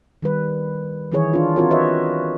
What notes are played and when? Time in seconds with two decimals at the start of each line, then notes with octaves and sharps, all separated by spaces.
0.22 D#3 G3 B4
1.12 D#3 E3 E4 G#4 C#5
1.34 D4 F4
1.56 C4 F4 F#4 A#4 C#5
1.71 F#4 B4 C#5 D#5 E5